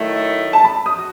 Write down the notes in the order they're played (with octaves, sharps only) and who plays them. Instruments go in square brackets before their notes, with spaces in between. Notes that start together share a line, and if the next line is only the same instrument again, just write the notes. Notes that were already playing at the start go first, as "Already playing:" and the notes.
Already playing: [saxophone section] D#3 F#3 A3 E4
[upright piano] A5
B5
D#6
[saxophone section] F#4